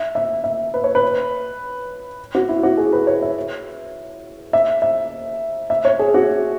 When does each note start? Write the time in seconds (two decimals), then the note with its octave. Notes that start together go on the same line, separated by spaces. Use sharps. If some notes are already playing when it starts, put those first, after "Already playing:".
Already playing: E5
0.15 E5
0.44 E5
0.74 B4
0.84 C#5
0.95 B4
2.35 F#4
2.49 E4
2.63 F#4
2.77 G#4
2.93 B4
3.07 C#5
3.22 E5
4.53 E5
4.82 E5
5.70 E5
5.85 C#5
5.99 G#4
6.14 F#4